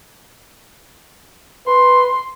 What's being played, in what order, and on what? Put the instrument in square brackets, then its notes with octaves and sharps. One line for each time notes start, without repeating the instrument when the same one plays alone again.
[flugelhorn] B4 [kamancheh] C6